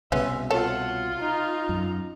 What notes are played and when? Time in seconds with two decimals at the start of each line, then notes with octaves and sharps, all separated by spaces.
0.12 C2 B2 G#3 B3 C#4 E5
0.50 F4 A4 C#5 F#5
1.21 D#4 A#5
1.69 F#2